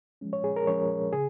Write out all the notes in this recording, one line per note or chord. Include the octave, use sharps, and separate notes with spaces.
F3 G#3 C#4
C#5
G#4
A#4
F3 G#3 C#4 C#5
C#3 G#4